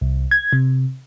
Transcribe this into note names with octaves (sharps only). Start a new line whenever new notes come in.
C2
G#6
C3